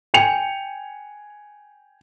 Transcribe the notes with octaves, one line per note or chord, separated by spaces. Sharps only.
G5 G#5 C#7 F7